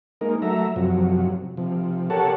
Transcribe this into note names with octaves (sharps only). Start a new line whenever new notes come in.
G#3 A#3 D#4 A#4
F#3 A3 E5 A#5
F#2 C3 F3 F#3
C3 F3
G4 A4 A#4 C#5 F#5 A5